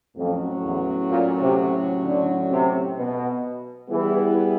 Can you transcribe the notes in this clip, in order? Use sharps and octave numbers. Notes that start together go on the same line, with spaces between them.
F2 A2 F#3 A3 C#4 F#4
E2
A#2
C3
D3
C3
B2
E3 G3 B3 E4 G#4